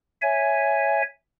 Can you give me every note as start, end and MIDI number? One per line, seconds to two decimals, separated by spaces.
0.22 1.02 73
0.22 1.02 76
0.22 1.02 80